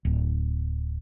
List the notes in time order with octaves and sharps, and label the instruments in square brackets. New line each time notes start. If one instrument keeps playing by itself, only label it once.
[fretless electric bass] D1